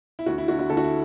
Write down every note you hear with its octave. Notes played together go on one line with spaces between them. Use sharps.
E4
D2 F#4
E4
D3 F#4
F#4
D2 A4
F#4
E4